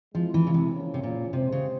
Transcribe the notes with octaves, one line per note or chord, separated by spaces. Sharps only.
F3 G#3 C4 E4
E3
C#3
C3
C#3 F3 A#3 C#4
C3
A#2
C3 G#3 C4 G4 C5
C#3